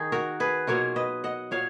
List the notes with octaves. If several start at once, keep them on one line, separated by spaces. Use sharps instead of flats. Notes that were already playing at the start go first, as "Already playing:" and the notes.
Already playing: D#3 D#4 G#4
F#4 A#4
G#4 B4
B2 F#3 A#3 F4 A#4 C#5
B4 D#5
D#5 F#5
A#2 F#3 C#5 F5